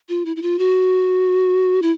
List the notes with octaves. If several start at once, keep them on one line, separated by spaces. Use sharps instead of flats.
F4
E4
E4
F4
F#4
E4